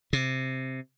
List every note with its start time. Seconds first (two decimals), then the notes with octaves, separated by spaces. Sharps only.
0.13 C3